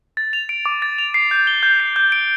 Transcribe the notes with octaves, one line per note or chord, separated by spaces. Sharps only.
A6
F7
D7
D6
A6
F7
C7
G6
G7
G6
C7
G6
D7